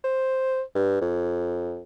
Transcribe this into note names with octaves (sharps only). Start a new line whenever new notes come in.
C5
G2
F2